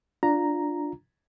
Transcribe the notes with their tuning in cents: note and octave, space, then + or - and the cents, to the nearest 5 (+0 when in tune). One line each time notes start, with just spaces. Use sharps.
D4 +0 F4 +0 A#5 +0